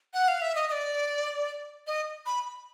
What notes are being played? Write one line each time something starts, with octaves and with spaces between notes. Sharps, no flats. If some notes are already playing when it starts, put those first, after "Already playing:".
F#5
F5
E5
D#5
D#5
D5
D#5
B5